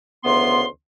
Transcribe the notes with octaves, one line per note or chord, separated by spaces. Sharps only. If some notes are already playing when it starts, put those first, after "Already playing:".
D2 C#3 E3 B3 C6